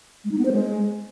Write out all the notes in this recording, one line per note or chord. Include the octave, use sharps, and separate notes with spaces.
G#3
D#4
B3
C5
G#3